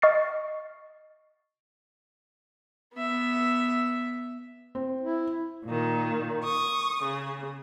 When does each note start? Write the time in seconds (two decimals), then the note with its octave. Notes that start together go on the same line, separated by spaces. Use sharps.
0.02 D#5 C#6 F6 A6 C7
2.94 B3 E5
4.75 C4
5.01 E4
5.66 A#2 D#3
6.42 C#6 D#6
7.04 C#3